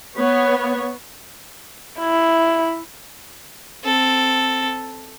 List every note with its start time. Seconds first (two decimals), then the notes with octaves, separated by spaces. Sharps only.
0.16 B3 C#5
1.99 E4
3.84 C4 A4